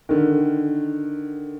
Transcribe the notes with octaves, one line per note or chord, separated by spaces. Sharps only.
D3 D#3